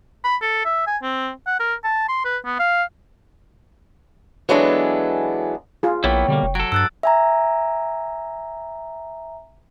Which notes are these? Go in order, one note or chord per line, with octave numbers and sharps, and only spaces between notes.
B5
A4
E5
G#5
C4
F#5
A#4
A5
C6
B4
B3
F5
E3 F#3 G#3 B3 D4 A4
F4 G#4
A#1 A#3 B3 E4 C#5 G5
B2 D3 G3 A#3
F1
F#3 A4 D7
G2 E6 F#6 A6
E5 G#5 A#5